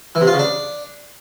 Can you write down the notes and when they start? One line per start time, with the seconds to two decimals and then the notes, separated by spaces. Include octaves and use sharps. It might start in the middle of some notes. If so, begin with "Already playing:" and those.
0.15 E3
0.21 C3
0.27 F4
0.33 C#3
0.39 D4